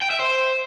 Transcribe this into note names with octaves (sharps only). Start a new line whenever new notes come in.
G5
E5
C5